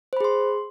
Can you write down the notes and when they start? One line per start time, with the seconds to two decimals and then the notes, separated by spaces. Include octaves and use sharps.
0.13 C5
0.17 B5
0.21 G#4
0.24 C6